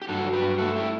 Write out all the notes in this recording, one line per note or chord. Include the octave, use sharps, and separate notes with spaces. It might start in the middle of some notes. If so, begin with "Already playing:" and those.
G4
G2 F#4 A4
F#3
G4 B4
G2
A3 F#4 A4
E4 G4